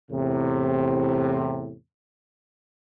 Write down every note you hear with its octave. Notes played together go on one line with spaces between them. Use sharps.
E2 A2 C3